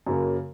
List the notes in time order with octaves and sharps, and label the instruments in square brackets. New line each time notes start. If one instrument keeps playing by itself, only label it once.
[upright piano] F#2 C#3 F#3 A#3